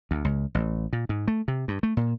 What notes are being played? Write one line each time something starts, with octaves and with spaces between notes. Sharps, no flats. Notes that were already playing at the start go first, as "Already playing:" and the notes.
D2
C#2
A1
A#2
G#2
A3
C3
G2
A3
A#2